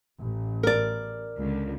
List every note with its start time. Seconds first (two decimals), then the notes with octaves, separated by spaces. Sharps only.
0.19 A1
0.63 A#4 D5
1.37 C#2 D3